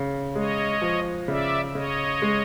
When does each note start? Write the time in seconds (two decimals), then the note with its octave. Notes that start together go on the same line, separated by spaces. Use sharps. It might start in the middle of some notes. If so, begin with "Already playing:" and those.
Already playing: C#3
0.35 G#3 C#5 D#5
0.82 F3
1.28 C#3 D5 E5
1.75 C#3 C#5 D#5
2.22 G#3